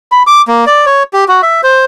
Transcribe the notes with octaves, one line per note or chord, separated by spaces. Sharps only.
B5
D6
A#3
D5
C#5
G4
F#4
E5
C5